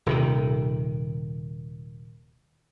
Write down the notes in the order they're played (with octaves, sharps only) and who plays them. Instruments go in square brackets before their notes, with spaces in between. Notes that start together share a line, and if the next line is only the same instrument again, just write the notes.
[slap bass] D#1 C3 D#3